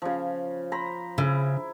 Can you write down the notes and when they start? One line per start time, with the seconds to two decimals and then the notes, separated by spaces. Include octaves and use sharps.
0.02 C#3 F3
0.72 C5 A#5 B5
1.18 C#3 E4